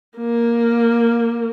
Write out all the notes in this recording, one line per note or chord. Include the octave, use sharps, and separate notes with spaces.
A#3